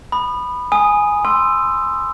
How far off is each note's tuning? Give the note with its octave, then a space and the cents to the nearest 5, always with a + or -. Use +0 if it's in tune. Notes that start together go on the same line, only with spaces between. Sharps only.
B5 +0 D#6 -30
G#5 +0 D#6 +0
G#5 +0 C6 +0 E6 +15